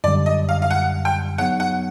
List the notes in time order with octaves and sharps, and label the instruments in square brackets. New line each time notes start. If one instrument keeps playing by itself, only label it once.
[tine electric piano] F#2 D3 G3 [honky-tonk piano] D5
[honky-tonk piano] D#5
F5
F5
F#5
G5
[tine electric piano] F#3 B3 D#4 G#4 C#5 [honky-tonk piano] F#5
[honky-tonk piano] F#5